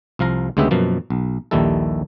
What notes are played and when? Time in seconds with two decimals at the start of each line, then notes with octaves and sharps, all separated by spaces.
0.19 C2 F3 F5 A#5
0.57 D2 C#3 G#3 B3 G4 E5
0.71 F#2 B2 F3 A#3
1.10 B1
1.51 A#1 D#2 D#3 G3 E4 A4